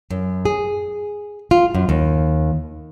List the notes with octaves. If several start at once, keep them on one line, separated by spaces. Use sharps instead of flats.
F#2
G#4
F4
F#2
D#2